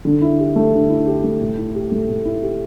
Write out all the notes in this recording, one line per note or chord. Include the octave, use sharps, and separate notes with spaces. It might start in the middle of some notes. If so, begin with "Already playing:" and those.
D3
E4
G4
A3
D3
E4
G4
A3
A2
E4
G4
A3
A2
E4
G4